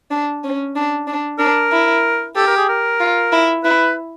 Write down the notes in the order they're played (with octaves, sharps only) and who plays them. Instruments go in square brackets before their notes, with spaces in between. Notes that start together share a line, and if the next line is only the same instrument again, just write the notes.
[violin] D4
C#4
D4
D4
[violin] D4 [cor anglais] A#4
[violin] E4
[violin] G4 [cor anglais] A4
[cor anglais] A#4
G#4
A#4
[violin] F4
E4
[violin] E4 [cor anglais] B4